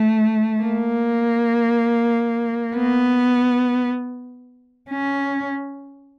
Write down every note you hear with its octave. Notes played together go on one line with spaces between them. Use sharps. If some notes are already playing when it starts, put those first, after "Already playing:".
Already playing: A3
A#3
B3
C#4